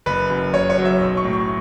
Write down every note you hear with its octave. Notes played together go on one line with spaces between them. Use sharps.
F#1 B4
F#2
F#1 C#5
C#5
F#3
E5
B1
C#6
A2
C#6